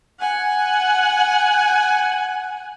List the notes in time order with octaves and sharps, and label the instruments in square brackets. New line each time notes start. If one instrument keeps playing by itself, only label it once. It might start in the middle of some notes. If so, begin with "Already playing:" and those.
[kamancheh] F#5 G#5